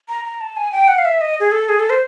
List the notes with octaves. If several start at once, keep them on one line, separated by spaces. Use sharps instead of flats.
A#5
A#5
A5
G#5
G5
F#5
F5
E5
D#5
G#4
A4
G#4
A4
C5